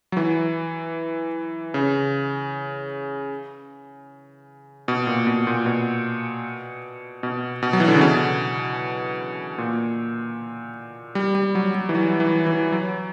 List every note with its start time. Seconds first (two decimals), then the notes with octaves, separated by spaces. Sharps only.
0.12 F#3
0.17 E3
1.74 C#3
4.88 B2
5.07 A#2
5.27 B2
5.47 A#2
5.66 B2
7.23 B2
7.63 B2
7.73 F#3
7.80 E3
7.88 D3
7.94 C#3
8.01 B2
9.58 A#2
11.15 G3
11.35 G3
11.55 F#3
11.75 G3
11.89 E3
11.95 F#3
12.20 E3
12.46 E3
12.72 F#3